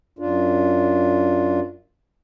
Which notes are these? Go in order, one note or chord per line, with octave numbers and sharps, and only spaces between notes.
F#2 D4 F4